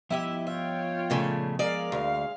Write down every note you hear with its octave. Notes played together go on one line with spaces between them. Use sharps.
F3 B3 E4 G4 D#5 E5
F4 C#5 E5 G5
A#2 C#3 A3
G#3 A#4 D5 F5
D2 F5